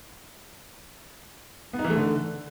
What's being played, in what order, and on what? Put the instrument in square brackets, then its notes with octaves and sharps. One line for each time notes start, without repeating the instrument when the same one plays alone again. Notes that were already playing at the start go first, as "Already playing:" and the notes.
[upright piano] B3
D#4
E3
A3
D3